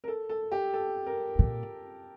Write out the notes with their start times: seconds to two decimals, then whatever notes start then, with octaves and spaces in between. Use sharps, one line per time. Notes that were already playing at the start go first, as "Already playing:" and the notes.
0.04 A#4
0.08 A4
0.29 A4
0.52 G4
0.74 A4
1.06 A#4
1.39 A#2